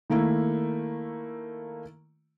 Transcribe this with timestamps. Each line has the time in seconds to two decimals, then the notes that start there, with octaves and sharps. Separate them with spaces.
0.10 D#3 A3 A#3 E4